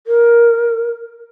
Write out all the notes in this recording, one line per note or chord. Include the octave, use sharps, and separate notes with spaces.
A#4